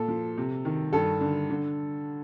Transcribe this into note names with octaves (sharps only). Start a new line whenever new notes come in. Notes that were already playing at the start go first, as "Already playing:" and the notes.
Already playing: A#2 A4
F3
C3
D#3
G2 A4
D3
D3